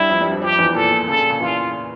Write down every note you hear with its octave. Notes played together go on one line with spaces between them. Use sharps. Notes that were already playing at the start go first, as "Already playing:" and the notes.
Already playing: G2 G3 E4
F2 F3
G2 G3
F2 F3
F2 F3 G4
E2 E3
A#2 A4
A#2
C#3 A4
A#2
C#3
E2 E3 F4